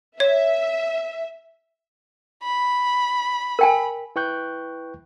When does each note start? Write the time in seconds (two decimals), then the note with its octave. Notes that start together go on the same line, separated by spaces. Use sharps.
0.20 C#5 E5
2.43 B5
3.59 A#4 G5 G#5
4.16 E4 B4 G5 C#6 F#6 G6